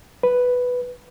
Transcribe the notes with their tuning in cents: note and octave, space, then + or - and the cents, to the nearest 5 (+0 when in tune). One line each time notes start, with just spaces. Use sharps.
B4 +0